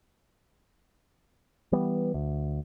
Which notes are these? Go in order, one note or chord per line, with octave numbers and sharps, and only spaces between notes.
E3 G3 B3
D2